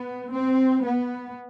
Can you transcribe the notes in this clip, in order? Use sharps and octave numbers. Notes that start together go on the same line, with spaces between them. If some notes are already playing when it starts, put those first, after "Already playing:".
Already playing: B3
C4
B3